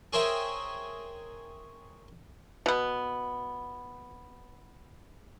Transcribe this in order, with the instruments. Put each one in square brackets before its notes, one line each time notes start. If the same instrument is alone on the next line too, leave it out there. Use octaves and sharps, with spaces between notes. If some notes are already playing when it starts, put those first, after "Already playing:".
[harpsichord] G#4 A#4 C5 C#5 E5 G5
[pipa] B2 B3